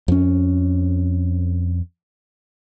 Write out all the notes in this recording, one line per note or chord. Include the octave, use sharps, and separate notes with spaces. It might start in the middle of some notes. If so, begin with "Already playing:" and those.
F2 C#4